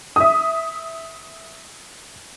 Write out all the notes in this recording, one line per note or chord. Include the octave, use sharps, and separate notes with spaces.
E5 D#6